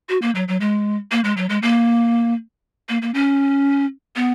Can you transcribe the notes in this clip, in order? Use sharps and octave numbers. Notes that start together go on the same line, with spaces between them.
F#4
A#3
F#3
F#3
G#3
A#3
G#3
F#3
G#3
A#3
A#3
A#3
C#4
B3